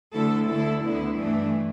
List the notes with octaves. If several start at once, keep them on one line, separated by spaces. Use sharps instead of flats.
D2 D3 E4 A4
D2 D3 E4 A4
D2 D3 B3 E4
G2 E3 A3 D4